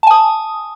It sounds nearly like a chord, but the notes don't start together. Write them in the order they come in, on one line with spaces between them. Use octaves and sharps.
A5 G#5 D#6